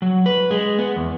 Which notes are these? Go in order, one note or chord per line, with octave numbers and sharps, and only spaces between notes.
F#3
B4
G#3
B3
E2